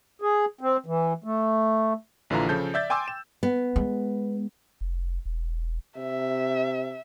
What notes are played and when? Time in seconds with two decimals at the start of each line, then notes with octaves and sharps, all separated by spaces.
0.22 G#4
0.61 C4
0.86 E3
1.24 A3
2.30 A#1 D3 E3 F4 A#5
2.49 C#3 F3 A4 G6
2.74 D5 E5 G6 A6
2.90 G5 G#5 C6 D6 E6
3.08 E7
3.43 B3
3.76 G#3
4.81 F1
5.25 E1
5.98 C3 E5